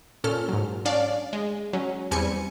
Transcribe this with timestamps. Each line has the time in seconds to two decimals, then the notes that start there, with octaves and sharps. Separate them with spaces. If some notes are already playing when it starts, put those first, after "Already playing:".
0.24 A#2 C#4 A4 F6
0.49 G#2 F#3
0.85 C#4 D4 D5 F5
1.33 G#3
1.73 F#3 C#4
2.11 E2 G3 C4 G#5 C#7